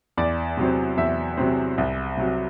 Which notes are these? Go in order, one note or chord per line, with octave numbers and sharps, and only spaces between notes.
E2 D5
C3 F#3 C4
E2 E5
C3 F#3 C4
C2
C3 F#3